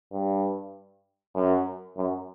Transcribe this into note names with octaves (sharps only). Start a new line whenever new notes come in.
G2
F#2
F#2